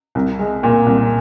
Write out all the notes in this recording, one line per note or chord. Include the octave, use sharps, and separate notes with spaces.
C2
G#3
A#2
C2